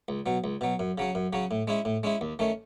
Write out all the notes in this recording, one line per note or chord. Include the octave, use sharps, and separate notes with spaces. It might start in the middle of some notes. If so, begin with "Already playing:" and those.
C#2
B2 F#3
C#2
B2 F#3
F#2
C#3 F#3 C#4
F#2
C#3 F#3 C#4
A2
G#3 C#4 E4
A2
G#3 C#4 E4
D#2
D#3 A3 C#4